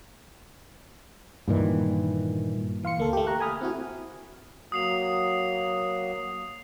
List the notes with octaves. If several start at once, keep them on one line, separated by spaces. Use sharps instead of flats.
G2 A#2 D#3 E3
E3 F5 C6 C#7
D2 A#3 A4
A3 G4
A#5 C#6 F#6
G#5 B5 D#6 F6
C4 E4 F#4
F#3 A#3 F#4 D#6 C7 F7